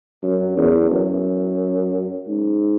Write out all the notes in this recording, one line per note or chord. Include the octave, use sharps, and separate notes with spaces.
F#2
E2
F#2
G#2